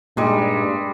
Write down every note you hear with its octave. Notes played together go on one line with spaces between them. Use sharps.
G2 A#2 G3 G#3 D#4